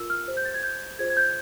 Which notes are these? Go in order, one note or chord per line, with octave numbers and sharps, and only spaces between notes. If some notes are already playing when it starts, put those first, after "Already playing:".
Already playing: F4 A#4 E6
F6
G4 C5
G6
A6
G#6
G6
F4 G#4 C5 G#6
G#6
G6